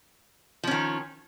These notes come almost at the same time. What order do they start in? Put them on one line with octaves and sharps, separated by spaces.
F3 C#4 D#3